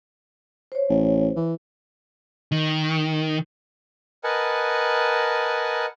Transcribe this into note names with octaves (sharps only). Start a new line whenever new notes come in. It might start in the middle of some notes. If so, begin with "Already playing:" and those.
C5 C#5
A1
E3
D#3
A#4 B4 D#5 F#5 G#5 A5